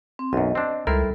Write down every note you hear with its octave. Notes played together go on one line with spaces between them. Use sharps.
C4
B1 F#2 D#5
C4 D4
C#2 G3 E4 A4 A#4 C5